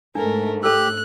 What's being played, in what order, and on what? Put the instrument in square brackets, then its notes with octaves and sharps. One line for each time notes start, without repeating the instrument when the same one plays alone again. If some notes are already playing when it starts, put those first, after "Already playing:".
[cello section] G#2 A3 [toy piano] D4 [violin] A4 A#4
[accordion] G4 [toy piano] A4 E6 [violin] F#6